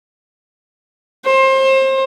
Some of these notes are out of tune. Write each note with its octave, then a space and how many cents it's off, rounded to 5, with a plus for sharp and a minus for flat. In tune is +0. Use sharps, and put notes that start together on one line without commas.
C5 +30